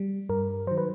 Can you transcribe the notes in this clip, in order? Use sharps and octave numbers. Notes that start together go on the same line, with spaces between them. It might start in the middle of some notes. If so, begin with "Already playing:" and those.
Already playing: G3
G2 A#4
D#3 F#3 C5
B4